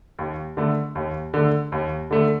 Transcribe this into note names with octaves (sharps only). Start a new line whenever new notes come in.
D#2
D3 A3
D#2
D3 A3
D#2
D3 A3